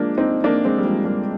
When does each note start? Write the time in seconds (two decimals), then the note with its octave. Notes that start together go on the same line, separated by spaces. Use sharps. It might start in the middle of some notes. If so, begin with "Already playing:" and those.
Already playing: F3 G#3 A#3 D4
0.17 C4 D#4
0.44 A#3 D4
0.65 G#3 C4
0.78 G3
0.85 F3 G#3
1.05 G3 A#3